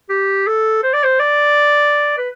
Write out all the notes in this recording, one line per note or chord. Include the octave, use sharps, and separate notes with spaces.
G4
A4
C5
D5
C5
D5
B4